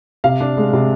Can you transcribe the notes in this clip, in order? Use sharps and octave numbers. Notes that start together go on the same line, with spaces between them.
C3 F5
D4
G#3
C3